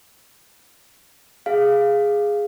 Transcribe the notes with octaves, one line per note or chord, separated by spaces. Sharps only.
G#4 F5